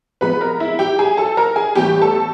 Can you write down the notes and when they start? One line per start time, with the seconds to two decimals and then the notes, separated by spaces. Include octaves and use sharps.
0.21 C3 F3 G#3 B3 B4 B5
0.41 A#4 A#5
0.60 E4 E5
0.79 G4 G5
0.99 G#4 G#5
1.17 A4 A5
1.37 A#4 A#5
1.56 G#4 G#5
1.75 A2 E3 G3 B3 G4 G5
2.02 A4 A5